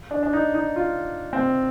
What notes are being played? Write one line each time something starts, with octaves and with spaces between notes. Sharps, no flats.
D4
D4
D#4
D#4
F4
C4